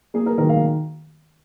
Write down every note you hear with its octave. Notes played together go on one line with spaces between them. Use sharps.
A#3 G#4
A#4
D#3 A#4
F5